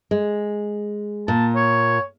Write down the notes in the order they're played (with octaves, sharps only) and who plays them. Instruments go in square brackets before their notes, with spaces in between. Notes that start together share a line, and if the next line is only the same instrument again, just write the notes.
[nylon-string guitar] G#3
[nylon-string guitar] A#2 [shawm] A5
[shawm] C#5